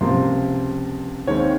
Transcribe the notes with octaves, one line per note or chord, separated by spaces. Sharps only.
C#2 C3 F3 A#3 C6
D#2 D#3 G#3 C4 C#5